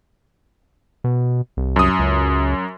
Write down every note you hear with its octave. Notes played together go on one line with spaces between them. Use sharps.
B2
C2
F#2 D#6
C#2